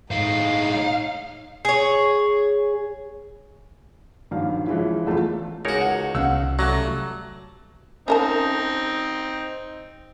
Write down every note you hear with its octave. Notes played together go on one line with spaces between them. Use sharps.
A2 G#3 D#4 F5
G#4 C#5
A#1 G2 D#3 F#3 F5
E3 F3 G#3 C#4 E4
E2 F3 G#3 A3 F4
C#2 D#4 F#4 G#4 A#4 C#5
F#5
C2 C4 C#4 F5 F#5 E6
F#3 G3 A3 F#6 A#6
C4 C#4 D#4 A#4 A5